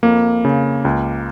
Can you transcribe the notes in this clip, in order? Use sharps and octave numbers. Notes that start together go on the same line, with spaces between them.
F2 A#3
C#3
C#2